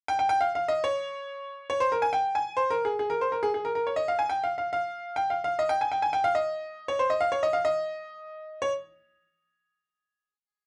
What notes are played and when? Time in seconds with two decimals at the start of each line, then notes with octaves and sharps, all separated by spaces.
0.08 G5
0.19 G5
0.29 G5
0.41 F5
0.55 F5
0.68 D#5
0.84 C#5
1.70 C#5
1.80 C5
1.92 A#4
2.02 G#5
2.13 G5
2.35 G#5
2.57 C5
2.70 A#4
2.85 G#4
2.99 G#4
3.10 A#4
3.21 C5
3.32 A#4
3.43 G#4
3.54 G#4
3.65 A#4
3.75 A#4
3.87 C#5
3.96 D#5
4.08 F5
4.19 G#5
4.29 G5
4.44 F5
4.58 F5
4.73 F5
5.16 G5
5.30 F5
5.44 F5
5.59 D#5
5.69 G5
5.81 G#5
5.92 G5
6.02 G#5
6.13 G5
6.24 F5
6.35 D#5
6.88 C#5
6.99 C5
7.10 D#5
7.21 F5
7.32 C#5
7.43 D#5
7.53 F5
7.65 D#5
8.62 C#5